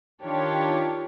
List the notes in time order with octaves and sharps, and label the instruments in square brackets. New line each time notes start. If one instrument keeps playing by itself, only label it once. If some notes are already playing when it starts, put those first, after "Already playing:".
[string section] D#3 D4 F4 G4 C#5